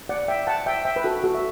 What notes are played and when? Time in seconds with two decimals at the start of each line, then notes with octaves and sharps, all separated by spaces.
0.09 D5 F#5
0.28 E5 G5
0.47 F#5 A5
0.66 E5 G5
0.85 E5 G5
0.96 B4
1.04 F#4 A4
1.24 F#4 A4
1.35 E5